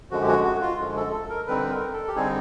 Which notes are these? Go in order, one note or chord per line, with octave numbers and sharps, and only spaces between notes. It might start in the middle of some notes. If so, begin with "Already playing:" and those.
F#2 D3 F3 G#3 F#4
G4
F#4
F#4
F4
F#2 D3 F3 G#3
A4
A4
A#4
D3 G3 C4 D#4 B4
A#4
A4
G4
D3 G3 C4 D#4 G#4